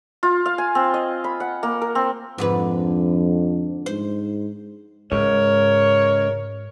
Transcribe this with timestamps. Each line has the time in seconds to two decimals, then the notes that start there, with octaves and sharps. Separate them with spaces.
0.23 F4
0.46 F5
0.58 G#5
0.75 C4
0.94 D#5
1.24 B5
1.40 F#5
1.63 A#3
1.82 A#4
1.95 C4
2.38 F2 G#2 D3 B4
3.86 G#2 C5
5.12 C#2 G#2 A#4 C#5